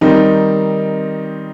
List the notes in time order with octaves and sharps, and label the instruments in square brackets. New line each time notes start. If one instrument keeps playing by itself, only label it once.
[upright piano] D#3 G3 C4 D#4